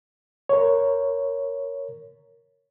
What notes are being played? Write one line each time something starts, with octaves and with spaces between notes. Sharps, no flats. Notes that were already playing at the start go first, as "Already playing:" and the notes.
A#4 C#5